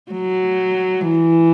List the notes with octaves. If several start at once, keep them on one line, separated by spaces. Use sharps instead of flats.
F#3
E3